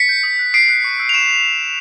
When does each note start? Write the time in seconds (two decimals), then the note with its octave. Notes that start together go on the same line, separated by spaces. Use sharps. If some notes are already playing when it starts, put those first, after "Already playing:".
Already playing: B6 C#7
0.09 G6
0.23 D#6
0.39 F#6
0.54 D#6 C7 D7
0.69 F#6
0.84 C#6
0.99 E6 G6
1.09 F7
1.13 C#6 D7 E7